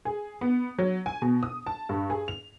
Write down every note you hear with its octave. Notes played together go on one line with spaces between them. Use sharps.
G#4
B3
F#3
G#5
B2
D#6
A5
G2
G#4
F7